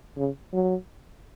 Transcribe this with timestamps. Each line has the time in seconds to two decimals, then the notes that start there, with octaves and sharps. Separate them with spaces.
0.17 C#3
0.53 F#3